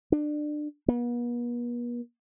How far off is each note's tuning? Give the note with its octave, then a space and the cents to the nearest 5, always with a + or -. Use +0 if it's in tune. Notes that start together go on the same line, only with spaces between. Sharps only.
D4 +25
B3 -45